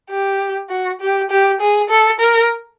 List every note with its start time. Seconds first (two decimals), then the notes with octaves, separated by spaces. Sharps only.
0.10 G4
0.69 F#4
1.01 G4
1.30 G4
1.61 G#4
1.89 A4
2.20 A#4